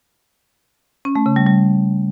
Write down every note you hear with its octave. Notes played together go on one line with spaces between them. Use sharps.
C#4
A3
C#3
G3
G3